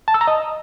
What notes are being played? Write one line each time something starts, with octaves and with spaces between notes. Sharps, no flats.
A5
E6
A#5
D#5